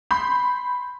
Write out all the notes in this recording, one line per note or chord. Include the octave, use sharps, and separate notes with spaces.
B5 C6 G6